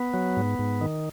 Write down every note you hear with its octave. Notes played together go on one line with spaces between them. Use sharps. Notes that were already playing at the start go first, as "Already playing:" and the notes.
Already playing: B3
F#3
G#2
G#2
D#3